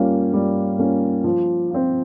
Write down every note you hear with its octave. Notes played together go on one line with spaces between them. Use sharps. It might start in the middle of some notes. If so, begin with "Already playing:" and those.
Already playing: G3 A#3 C#4 F4
G3
A#3 C#4 F4
F3
C4 F4